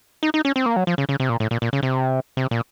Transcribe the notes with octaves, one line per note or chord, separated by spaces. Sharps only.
D#4
D#4
C#4
C4
A#3
F#3
F3
C#3
C#3
C3
A#2
A2
A#2
A#2
C#3
C3
C3
A#2